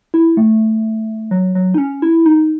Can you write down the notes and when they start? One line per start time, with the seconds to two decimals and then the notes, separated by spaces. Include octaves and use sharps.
0.14 E4
0.37 A3
1.31 F#3
1.55 F#3
1.74 D#4
1.78 C#4
2.02 E4
2.26 D#4